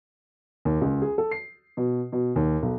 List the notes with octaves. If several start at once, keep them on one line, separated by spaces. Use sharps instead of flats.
D#2
C#2
G#4
A4
C7
B2
B2
D#2
B1